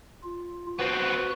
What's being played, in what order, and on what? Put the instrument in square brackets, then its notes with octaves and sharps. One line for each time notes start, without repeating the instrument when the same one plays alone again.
[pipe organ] F4
[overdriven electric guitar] B3 C4 [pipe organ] F#4 F#6